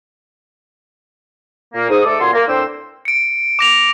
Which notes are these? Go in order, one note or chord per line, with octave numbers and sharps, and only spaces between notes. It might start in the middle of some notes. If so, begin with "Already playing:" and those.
A#2 A#3
G#2 D#6
A3 A4 D5
F#2 A#2 F#5 G#5 C6
A#3
A2 C4 D4 C5 G5 E6
C#7 D7
D6 A#6 F7